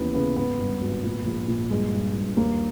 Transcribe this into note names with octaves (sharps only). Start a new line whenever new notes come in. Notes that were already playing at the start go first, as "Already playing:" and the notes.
Already playing: D#2 E3 B3 C#4
C#3 B3
G#1 B3
G2
G#1
A#2
A#1
A#2
G2 G#3
G2
G2
D#2 A#3